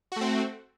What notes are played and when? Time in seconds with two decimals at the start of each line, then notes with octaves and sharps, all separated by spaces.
0.12 F#4
0.16 A3
0.21 C4